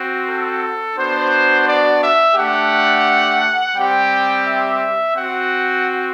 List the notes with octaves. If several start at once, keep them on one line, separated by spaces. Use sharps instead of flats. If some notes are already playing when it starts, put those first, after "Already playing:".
Already playing: C4 F#4
A4
B3 D4 F#4 C5
D5
E5
A3 D4 G4 F#5
G3 C4 G4 G5
E5
C4 F#4 F#5